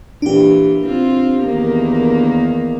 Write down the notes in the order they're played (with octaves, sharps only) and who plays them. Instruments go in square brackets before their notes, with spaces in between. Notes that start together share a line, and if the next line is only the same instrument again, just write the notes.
[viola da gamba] A#2 E3 [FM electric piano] D4 G4
[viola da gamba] C4 F4
E2 D#3 A#3